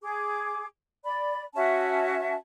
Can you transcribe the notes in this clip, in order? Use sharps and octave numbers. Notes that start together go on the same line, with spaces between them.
G#4 D6
D5 B5
C#4 F#4 E5 A5